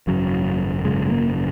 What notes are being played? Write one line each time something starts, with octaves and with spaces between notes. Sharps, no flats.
G#1 F#2 C#3 F#3
G#1 F#2 C#3 G#3
G#3
A#3